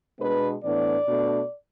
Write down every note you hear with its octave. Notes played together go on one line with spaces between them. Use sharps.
B2 G#3 B3 D4 B4
A2 E3 B3 D4 D5
B2 A3 D4